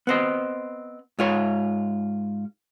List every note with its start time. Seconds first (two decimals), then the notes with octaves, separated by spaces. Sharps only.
0.07 B3 C4 D#5
1.19 G#2 F4 C#5